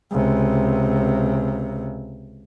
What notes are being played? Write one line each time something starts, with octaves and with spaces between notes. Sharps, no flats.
C#2 C3